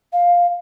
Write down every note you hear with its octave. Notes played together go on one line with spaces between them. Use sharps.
F5